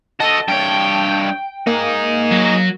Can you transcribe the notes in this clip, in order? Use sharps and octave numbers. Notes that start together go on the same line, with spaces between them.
F#4 A4 D#5 A5
G2 C#5 G5
A#3 D#4 G#4
F#3